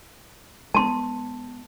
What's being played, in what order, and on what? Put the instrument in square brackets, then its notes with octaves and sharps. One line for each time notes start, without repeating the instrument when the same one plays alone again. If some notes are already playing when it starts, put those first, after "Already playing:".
[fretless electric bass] G#3 B3 [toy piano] A5 C6